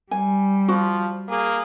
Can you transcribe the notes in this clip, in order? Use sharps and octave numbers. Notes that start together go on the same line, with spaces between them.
G3 G#5
F3 F#4
A#3 G#4